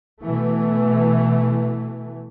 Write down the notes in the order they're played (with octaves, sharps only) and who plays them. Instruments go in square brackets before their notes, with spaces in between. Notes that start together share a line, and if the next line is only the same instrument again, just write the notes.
[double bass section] B2 E3 A3